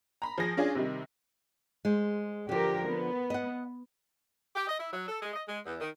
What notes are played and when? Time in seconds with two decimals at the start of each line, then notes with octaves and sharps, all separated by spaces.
0.22 A#5 B5
0.38 F3 G#4 A#6
0.57 C#4 D4 F4 G#4
0.75 C3 D#3 G3
1.85 G#3 C5
2.49 D3 F3 G4 A#4
2.87 B3
3.30 D#5 F#5
4.56 G4
4.68 D#5
4.80 E4
4.93 F#3
5.08 A4
5.22 G#3
5.34 D#5
5.48 G#3
5.66 E2
5.81 D#3